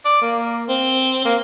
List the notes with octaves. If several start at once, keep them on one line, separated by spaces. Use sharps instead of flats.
D5
A#3
C4
A#3